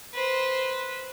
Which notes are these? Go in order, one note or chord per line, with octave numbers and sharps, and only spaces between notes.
B4 C5